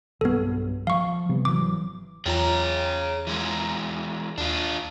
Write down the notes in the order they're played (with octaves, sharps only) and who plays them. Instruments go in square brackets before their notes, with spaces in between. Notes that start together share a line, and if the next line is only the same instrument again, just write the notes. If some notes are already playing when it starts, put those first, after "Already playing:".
[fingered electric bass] B1 G2 [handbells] B3 A4
[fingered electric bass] F3 [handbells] F5 C#6
[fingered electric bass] C3 G3 B3
[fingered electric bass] G#1 E3 F#3 [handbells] D6
[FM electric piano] E2 F4 A#5 [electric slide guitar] G#4 C#5 G5
[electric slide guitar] E3 G#3 A#4
[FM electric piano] D#2 [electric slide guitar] D4 F4